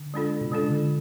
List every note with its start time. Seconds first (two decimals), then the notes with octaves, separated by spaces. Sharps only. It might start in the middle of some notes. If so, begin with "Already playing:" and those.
Already playing: D3
0.14 G#3 D4 F4 A4
0.41 B2
0.51 C#3 G#3 D4 F4 A4
0.70 D3